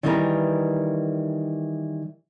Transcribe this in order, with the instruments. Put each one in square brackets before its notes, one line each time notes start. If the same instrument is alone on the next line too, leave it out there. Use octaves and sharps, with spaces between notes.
[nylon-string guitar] D#3 E3 G3 G#4 A#4 B4